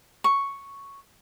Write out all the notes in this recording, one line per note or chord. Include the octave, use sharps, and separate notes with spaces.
C#6